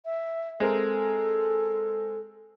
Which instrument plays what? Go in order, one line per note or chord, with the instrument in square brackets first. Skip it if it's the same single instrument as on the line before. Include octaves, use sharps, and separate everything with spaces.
[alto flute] E5
[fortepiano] G#3 C4 A#4 [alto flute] A4